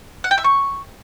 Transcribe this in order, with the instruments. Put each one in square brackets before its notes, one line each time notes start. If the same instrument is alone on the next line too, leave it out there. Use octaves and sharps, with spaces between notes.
[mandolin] F#5
G5
E5
C#6